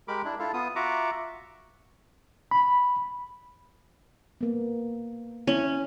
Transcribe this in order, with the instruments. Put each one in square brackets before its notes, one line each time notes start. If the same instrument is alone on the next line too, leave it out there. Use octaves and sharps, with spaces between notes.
[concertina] G#3 G4 A#4 B5 D6
D4 E4
E4 F4 A4 F5
B3 F4 D#6
F4 F#4 E5 F#5 A#5 D6
[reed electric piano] B5
[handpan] A#3 B3
[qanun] C#4 [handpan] E4